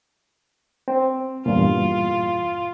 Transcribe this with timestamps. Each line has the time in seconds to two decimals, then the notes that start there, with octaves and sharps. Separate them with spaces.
0.88 C4
1.46 E2 G2 A#2 F4